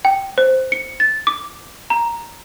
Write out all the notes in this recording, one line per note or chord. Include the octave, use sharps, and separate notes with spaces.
G5
C5
C#7
A6
D6
A#5